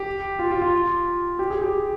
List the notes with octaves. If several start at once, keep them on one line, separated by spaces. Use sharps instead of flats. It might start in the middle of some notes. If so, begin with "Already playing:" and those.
Already playing: G4
F4
F4
F4
G4
G#4
G4